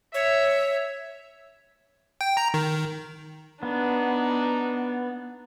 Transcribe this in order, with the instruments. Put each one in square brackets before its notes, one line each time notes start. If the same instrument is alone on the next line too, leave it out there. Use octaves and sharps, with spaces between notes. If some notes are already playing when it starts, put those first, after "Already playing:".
[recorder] C#5 [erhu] E5
[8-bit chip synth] G5
A#5
D#3
[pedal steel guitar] B3 [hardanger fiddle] D4 D#4